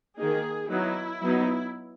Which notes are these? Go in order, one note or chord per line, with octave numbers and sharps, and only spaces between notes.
D#3 A#3 D#4 G#4
F#3 B3 D#4 E4
F#3 B3 D#4